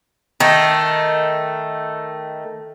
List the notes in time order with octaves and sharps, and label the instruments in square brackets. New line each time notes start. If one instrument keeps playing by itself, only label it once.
[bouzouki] D#3 A3